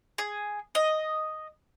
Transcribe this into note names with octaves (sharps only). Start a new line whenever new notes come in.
G#4
D#5